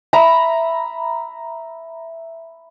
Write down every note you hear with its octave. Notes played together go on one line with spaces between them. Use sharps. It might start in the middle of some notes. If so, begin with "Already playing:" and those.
E5 A#5 B5